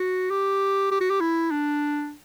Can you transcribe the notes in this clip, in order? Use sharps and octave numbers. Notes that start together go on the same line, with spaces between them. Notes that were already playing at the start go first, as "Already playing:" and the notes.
Already playing: F#4
G4
G4
F#4
G4
E4
D4